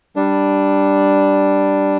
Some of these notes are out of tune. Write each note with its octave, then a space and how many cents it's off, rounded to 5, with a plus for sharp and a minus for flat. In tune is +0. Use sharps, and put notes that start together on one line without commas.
G3 +0 D4 +0